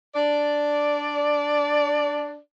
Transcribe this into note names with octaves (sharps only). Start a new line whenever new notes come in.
D4 D5